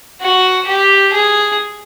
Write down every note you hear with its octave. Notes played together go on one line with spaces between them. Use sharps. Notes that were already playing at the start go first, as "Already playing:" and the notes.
F#4
G4
G#4